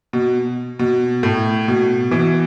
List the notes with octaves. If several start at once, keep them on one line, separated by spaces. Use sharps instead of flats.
B2
B2
A2
B2
B2 E3